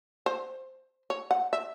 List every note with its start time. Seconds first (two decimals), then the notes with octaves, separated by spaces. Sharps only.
0.26 C5
1.10 C#5
1.31 F#5
1.53 E5